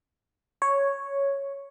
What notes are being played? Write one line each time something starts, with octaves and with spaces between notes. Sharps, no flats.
C#5